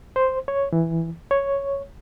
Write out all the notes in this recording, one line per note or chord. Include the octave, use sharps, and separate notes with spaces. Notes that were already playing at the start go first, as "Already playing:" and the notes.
C5
C#5
E3
C#5